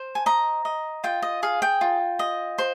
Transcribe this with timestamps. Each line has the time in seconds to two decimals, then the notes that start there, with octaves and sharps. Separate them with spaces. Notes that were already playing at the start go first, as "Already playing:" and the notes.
Already playing: C5
0.15 G#5
0.26 D#5 A#5
0.65 D#5
1.04 F4 G5
1.22 D#5
1.43 G#4 F5
1.62 G5
1.81 F4
2.19 D#5
2.58 C5